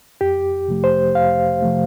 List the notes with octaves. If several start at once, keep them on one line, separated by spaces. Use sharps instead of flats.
F2 G4
C3 F3 A3
C5
F2 F5
C3 F3 A3